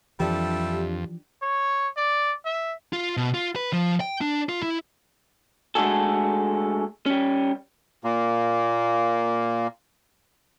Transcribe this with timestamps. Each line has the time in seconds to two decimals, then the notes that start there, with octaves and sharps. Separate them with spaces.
0.20 F2 E3 F3 G3 D4 G4 A4 E5
1.42 C#5
1.97 D5
2.45 E5
2.93 F4
3.17 B2
3.34 F4
3.56 B4
3.73 F3
4.00 G5
4.21 D4
4.49 F4
4.63 E4
5.75 G#3 A3 D4 F#4 G#4 A4
7.06 G3 C#4
8.04 A#2 A#3